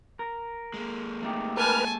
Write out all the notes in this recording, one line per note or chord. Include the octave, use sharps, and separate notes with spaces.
A#4
G#3 A#3
A3 D#4 G4
A#4 B4 G#5 A5 F6